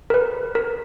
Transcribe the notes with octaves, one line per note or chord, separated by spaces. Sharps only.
A#4
B4
A#4